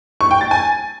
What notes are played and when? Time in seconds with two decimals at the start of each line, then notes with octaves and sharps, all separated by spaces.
0.21 C#6
0.31 G5
0.41 A6
0.51 G#5